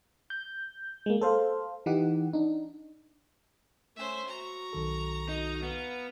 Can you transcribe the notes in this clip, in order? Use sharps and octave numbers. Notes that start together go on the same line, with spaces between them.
G6
G#3 A#3
A4 C5 F5
E3 D#4 G4 F#5
D4 D#4
A3 C#4 C5 E5
F#4 A#5 C#6
B1 D#3 A4
D#4 F#4 D#5
B3 F5